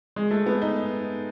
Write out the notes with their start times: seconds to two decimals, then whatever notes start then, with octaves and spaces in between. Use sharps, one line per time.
0.16 G#3
0.31 A3
0.46 B3
0.62 D#4